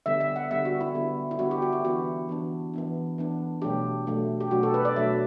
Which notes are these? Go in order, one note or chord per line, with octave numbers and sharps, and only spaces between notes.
D3 G3 B3 E5
E5
F#5
D3 G3 B3 E5
F#4
E4
D3 G3 B3
E4
D3 G3 B3 F#4
G4
F#4
E4
E3 B3 D4 F#4
E3 B3 D4
E3 B3 D4
E3 B3 D4
B2 F#3 A3 D4 G4
B2 F#3 A3 D4
G4
B2 F#3 A3 D4 F#4
A4
B4
D5
B2 F#3 A3 D4 E5